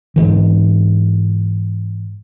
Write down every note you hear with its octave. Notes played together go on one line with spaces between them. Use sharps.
G#2 E3